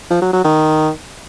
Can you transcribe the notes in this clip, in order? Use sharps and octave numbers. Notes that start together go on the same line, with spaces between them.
F3
F#3
F#3
D#3